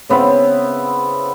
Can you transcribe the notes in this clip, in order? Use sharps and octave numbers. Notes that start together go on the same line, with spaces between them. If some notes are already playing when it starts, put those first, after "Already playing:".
C#3 B3 C4 E4